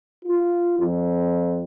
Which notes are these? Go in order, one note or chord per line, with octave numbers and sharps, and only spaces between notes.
F4
F2